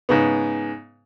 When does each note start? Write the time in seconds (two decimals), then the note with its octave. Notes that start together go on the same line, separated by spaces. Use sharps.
0.09 G#2 C#3 B3